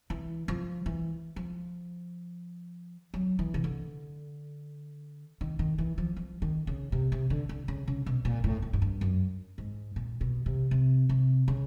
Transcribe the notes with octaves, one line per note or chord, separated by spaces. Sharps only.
E3
F3
E3
F3
F#3
E3
C#3
D3
D#3
D#3
E3
F3
F3
D#3
C#3
C3
C3
D3
D3
C#3
C#3
B2
A#2
A2
G#2
G#2
G2
F#2
G#2
A#2
B2
C3
C3
C3
C#3